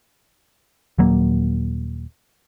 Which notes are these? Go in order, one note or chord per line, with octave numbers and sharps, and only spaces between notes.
D#1 F#3 A#3